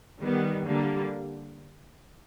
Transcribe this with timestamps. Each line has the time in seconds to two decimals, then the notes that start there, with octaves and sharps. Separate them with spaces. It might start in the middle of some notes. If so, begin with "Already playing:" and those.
0.21 D#3 G3 B3
0.65 D3 G3 A#3